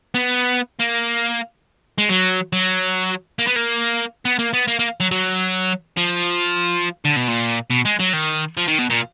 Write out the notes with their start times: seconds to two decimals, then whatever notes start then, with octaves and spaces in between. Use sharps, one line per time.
0.15 B3
0.80 A#3
1.98 G#3
2.09 F#3
2.53 F#3
3.39 A#3
3.47 B3
3.56 A#3
4.25 B3
4.39 A#3
4.54 B3
4.68 A#3
4.79 A#3
5.00 F#3
5.11 F#3
5.97 F3
7.05 D3
7.16 B2
7.28 A#2
7.70 B2
7.85 G#3
8.00 F#3
8.13 D#3
8.57 F3
8.68 D#3
8.78 B2
8.90 A#2